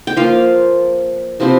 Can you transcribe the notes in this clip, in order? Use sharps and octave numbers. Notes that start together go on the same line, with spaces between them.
G5
F3 A#3 F4 F5
C3 F3 C4 E4